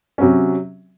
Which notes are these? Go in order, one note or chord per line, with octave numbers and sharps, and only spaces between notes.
C3 F#3 C#4